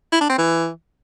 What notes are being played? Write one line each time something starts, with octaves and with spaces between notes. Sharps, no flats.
E4
D4
C4
E3